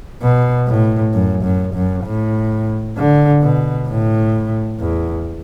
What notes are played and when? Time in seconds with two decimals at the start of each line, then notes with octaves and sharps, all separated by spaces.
0.22 B2
0.68 A2
1.13 F#2
1.44 F#2
1.75 F#2
2.05 A2
2.97 D3
3.42 B2
3.88 A2
4.80 E2